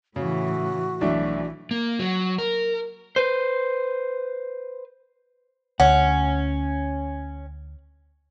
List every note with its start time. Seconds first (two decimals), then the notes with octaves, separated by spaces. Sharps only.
0.16 A2 C#3 E3 F#4
1.01 B1 E3 A3 D4
1.71 A#3
1.99 F#3
2.38 A#4
3.16 B4 C5
5.80 D2 C#4 F#5